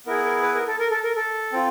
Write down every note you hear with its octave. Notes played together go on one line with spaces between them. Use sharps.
B3 E4 G#4 A#4
A#4
B4
A#4
A4
A#4
A4
A#4
A4
C4 F4